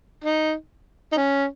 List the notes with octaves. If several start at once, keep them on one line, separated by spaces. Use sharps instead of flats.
D#4
D#4
C#4